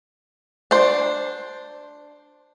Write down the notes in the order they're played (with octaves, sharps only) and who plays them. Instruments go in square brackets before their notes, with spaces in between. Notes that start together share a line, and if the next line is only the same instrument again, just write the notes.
[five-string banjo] D4 C5